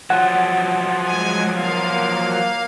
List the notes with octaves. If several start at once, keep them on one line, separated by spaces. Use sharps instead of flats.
F3 F#3 F#5
G#3 G#5
A#3 F5